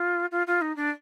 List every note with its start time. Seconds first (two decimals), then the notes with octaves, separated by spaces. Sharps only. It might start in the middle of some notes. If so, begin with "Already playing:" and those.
Already playing: F4
0.31 F4
0.46 F4
0.61 D#4
0.76 D4